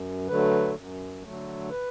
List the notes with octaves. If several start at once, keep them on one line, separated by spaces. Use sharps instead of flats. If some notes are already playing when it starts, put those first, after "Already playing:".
Already playing: F#2
D3 F#3 A3 B4
F#2
D3 F#3 A3
B4